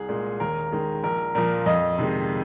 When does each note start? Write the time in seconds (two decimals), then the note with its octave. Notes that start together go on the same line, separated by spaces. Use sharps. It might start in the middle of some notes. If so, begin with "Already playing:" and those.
Already playing: C2 G#4
0.09 A#2 G#3
0.40 D#2 A#4
0.72 D#3 G#3
1.04 A#1 A#4
1.35 A#2 F3 A#4
1.66 F2 D#5
1.98 C3 D#3 G#3